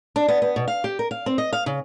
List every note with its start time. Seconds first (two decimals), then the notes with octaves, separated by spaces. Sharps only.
0.16 D4
0.28 B3
0.42 B3
0.56 B2
0.68 F5
0.84 G4
0.99 A#4
1.11 F5
1.26 C4
1.38 D#5
1.53 F5
1.66 C#3